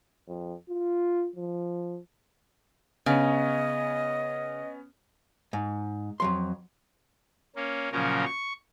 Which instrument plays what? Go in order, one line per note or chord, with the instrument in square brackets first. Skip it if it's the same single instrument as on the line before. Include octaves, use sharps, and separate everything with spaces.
[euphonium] F2
F4
F3
[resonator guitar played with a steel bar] C#3 [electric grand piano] B3 C#4 [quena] D#5
[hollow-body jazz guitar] G#2
F2 F#3 C6
[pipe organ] A#3 C#4
A#2 C#3 F3 F#3 C#4 A#4
C#6